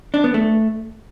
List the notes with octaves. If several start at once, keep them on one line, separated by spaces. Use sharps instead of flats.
D4
B3
A3